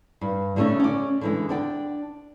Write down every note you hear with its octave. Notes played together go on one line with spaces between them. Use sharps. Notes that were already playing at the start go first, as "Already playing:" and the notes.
G2
D3 G3 A3 A#3 C#4 D#4
C#4 D5
D3 E3 G#3
D4 D5 G5